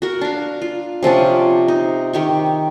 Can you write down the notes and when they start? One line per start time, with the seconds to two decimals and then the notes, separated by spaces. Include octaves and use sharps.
0.02 F#4 A#4
0.21 D4 F5
0.61 F4
1.03 C3 F3 C#4 D4
1.68 D#4
2.13 D#3 G4 C#6